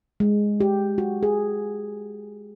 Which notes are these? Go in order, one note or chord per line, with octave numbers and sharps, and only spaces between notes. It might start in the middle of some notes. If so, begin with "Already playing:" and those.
G#3
G4
F#4
G#4